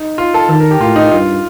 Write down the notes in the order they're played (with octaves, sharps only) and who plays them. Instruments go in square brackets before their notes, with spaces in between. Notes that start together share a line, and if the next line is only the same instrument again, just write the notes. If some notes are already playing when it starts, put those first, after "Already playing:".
Already playing: [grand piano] D#4
F4
A4
[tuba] D#3 [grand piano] A4
[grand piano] A#4
G4
[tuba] A2 [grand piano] F4
[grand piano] D#4
[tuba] G2 [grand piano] F4